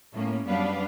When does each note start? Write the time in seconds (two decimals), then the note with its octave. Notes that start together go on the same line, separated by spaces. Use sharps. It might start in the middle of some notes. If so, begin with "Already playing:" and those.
0.13 A2 A3 A#3 C#4
0.46 F#2 G3 B3 D4 B4 F5